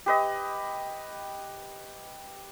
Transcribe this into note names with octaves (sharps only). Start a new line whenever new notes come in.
G4 B4 D#5